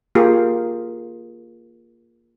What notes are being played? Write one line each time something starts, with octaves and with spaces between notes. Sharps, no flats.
A#3 F4 G4 G#4